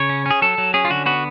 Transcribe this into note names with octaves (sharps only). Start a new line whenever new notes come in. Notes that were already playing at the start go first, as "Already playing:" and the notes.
Already playing: C#3 C#5
C#4
C#4 G#4
F#3 A4
F#3
C#4 G#4
F4
D3 F#4
B3 F#4